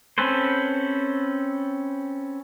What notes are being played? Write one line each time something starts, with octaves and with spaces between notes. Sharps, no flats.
C4 C#4 A4 B4 C5